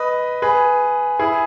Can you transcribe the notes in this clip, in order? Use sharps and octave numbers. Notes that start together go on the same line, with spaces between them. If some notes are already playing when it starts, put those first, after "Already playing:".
Already playing: B4 D#5
G#4 B4
E4 G#4